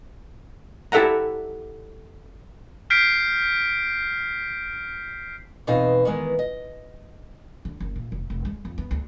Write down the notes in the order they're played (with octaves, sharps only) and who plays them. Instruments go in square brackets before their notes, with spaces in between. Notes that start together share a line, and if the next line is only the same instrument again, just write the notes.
[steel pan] E4 G4 A4 E5 F#5 A#5
[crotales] F6 G6 B6 C7 D7
[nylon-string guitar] E2 B2 C4 D#4 D#5 F5
D#3 E3 G#3 B3
D#5
[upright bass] D3
F#1
A#2
F1
F1
G#3
F2
B3
D2